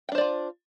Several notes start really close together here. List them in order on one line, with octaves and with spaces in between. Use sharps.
G5 D4 C5 D5 F4